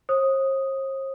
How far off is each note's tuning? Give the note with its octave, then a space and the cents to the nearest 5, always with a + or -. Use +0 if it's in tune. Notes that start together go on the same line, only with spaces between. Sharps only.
C5 +45 D#6 +0